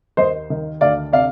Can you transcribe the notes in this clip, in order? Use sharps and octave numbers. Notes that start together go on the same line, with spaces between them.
D#2 C5 D#5
D#3
D2 D5 F5
C3 D5 F5